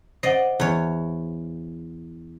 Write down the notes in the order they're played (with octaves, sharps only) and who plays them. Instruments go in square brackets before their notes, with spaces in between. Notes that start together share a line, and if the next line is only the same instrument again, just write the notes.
[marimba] C5 F#5 [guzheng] D5 D#5
[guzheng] E2 C#5